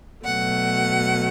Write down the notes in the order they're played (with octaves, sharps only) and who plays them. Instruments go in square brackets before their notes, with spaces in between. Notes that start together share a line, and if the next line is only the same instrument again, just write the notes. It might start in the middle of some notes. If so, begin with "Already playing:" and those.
[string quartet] B2 F#3 A3 F#5